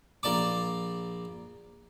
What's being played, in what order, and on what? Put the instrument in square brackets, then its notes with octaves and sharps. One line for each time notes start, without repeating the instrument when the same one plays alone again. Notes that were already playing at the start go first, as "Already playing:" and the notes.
[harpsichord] A#1 A#3 D5 A5 D6